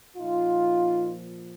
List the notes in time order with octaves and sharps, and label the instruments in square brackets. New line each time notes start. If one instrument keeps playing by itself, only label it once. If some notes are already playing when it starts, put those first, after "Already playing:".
[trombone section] A#2 F3 D#4 F4